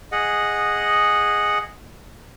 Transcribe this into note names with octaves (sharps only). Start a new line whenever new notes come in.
G#4 D#5 F#5